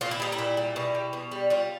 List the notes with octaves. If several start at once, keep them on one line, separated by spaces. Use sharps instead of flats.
A#2 F4
E4
G3 D#4
E4
A#2
G3
B2
G3
B2
G3
G3 F4